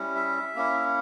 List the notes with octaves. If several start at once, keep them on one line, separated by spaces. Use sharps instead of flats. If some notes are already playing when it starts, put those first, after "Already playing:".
Already playing: G3 C#4 E4
E5
A#3 C#4 E4